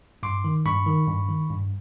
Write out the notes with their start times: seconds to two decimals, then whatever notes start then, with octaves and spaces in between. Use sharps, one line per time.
0.23 G2 C6 D6
0.44 D#3
0.65 G2 B5 C#6
0.86 D#3
1.07 G2
1.28 D#3
1.51 G2